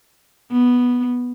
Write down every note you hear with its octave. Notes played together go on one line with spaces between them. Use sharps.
B3